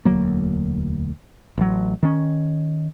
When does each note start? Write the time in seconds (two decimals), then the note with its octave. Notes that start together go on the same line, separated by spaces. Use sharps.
0.05 E1 D2 F#3 A#3
1.58 A1 F#3
2.03 D#3 C#4